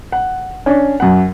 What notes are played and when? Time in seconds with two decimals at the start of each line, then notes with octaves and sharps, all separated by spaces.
0.12 F#5
0.66 C#4 D4
1.00 F#2 F#5